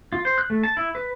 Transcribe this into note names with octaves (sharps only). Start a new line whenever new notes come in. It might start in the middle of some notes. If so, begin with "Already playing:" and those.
F4
C5
F#6
A3
A5
E4
B4